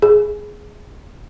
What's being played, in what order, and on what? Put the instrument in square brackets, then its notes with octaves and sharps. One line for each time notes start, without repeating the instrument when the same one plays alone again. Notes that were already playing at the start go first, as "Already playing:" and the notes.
[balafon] G#4